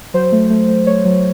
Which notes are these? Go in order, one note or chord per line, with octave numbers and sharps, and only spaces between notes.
F#3 C5
A3
A3
A3
A3 C#5
F#3